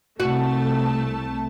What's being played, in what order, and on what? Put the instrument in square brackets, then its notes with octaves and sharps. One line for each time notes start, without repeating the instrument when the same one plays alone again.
[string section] C2 A3 A5 [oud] F#4